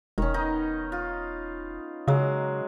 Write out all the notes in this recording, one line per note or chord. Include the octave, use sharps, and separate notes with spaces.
E1 D#3 C#4
B3 D#4 D#5
F4
C#3 F#3 G#3